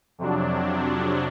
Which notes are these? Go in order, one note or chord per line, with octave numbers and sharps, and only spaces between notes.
F2 C3 F#3 D4